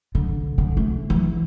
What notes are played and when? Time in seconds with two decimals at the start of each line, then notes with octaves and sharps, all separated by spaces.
0.15 D3
0.58 D3
0.77 A3
1.10 E3